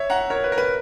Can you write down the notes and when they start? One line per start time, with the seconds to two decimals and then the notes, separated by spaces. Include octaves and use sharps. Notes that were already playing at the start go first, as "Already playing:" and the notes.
Already playing: C#5 E5
0.10 F#5 A#5
0.30 A#4 C#5
0.44 B4
0.52 A#4
0.58 B4